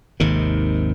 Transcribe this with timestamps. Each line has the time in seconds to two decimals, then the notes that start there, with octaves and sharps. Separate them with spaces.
0.20 G#1 D#2 C3 D#3